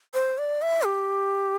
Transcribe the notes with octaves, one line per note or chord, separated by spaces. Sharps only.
C5
D5
E5
G4